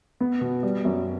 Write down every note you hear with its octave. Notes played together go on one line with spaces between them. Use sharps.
B3
B2
G3
F#2